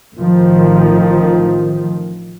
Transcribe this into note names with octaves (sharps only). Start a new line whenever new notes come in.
A1 D#3 F3